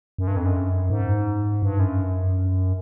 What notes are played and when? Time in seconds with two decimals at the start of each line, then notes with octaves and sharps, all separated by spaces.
0.18 F#2
0.28 G2
0.37 F2
0.46 F#2
0.90 G#2
1.62 G2
1.80 F#2